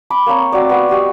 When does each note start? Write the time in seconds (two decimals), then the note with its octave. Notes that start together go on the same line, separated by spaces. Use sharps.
0.10 B5 D6
0.26 A#3 C4 C#5 A#5
0.52 C4 F#4 D5
0.69 B3 F#4 E5
0.89 F#4 G4 D#5